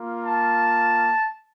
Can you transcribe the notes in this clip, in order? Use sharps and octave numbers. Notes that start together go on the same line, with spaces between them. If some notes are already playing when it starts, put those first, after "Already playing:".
Already playing: A#3 F4
A5